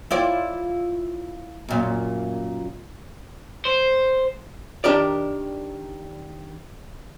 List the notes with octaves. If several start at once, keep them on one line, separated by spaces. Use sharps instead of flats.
E4 F4 D5
F#2 A#2 A#3
C5
D#3 D4 G4 A#4 D5